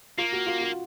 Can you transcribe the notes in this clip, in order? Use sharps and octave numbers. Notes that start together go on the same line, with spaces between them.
A#3 F4
F#4
F4
F#4